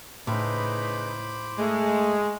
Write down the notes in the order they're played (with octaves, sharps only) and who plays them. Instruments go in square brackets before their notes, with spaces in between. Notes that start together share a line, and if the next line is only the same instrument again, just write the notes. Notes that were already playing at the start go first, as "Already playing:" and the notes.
[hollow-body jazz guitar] A2 [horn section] C#3 D#4 B4 [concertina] C5 B5 D6
[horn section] G#3 [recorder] A3